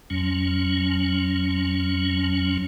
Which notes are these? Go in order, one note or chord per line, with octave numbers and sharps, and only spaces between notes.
F2 F#3 C#4